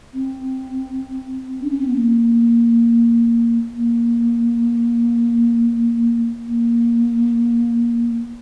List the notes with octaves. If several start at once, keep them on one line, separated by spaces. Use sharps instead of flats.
C4
D4
C#4
C4
B3
A#3
A#3
A#3